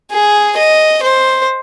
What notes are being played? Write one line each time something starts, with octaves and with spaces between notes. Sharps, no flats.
G#4
D#5
C5